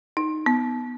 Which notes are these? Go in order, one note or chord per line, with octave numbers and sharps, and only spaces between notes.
D#4
B3